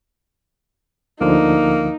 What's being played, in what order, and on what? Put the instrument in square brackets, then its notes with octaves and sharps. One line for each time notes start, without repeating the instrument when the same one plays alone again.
[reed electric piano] D2 D3 F3 [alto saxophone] A#3 [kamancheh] D#4